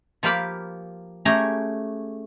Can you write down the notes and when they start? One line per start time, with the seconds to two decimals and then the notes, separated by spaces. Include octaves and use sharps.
0.23 F3 A#3 G4 F5 B5
1.25 A3 C#4 G4 G#4 A#5